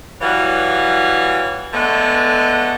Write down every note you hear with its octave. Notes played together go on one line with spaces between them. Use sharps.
E3 F#3 G3 F4 C#5
D3 G#3 A3 B3